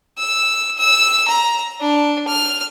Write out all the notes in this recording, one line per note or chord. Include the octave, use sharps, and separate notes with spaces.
E6
E6
A#5
D4
F6